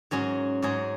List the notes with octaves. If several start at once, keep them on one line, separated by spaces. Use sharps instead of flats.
G#2 F#3 C#4 G#4
G#2 F#3 C#4 G#4